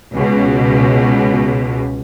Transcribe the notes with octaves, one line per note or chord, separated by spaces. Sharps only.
C#2 B2